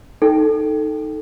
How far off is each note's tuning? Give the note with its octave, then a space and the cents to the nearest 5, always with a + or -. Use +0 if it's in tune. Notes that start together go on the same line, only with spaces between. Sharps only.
D#4 +0 A4 +0 G5 +0